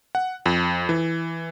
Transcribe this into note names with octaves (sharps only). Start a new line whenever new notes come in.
F#5
F2
E3